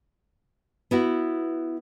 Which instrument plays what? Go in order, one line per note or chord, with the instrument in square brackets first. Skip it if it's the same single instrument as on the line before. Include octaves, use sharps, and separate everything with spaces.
[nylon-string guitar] B3 E4 F#4